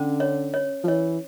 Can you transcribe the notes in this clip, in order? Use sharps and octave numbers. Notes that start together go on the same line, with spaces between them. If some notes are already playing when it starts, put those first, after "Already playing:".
Already playing: D3 C#4
C#5
C#5
F3
E3 C#5